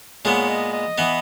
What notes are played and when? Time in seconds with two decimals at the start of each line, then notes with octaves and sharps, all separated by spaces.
0.25 A#2 G#3 B3 C#5
0.48 D#5
0.73 D#5
0.98 E3 B3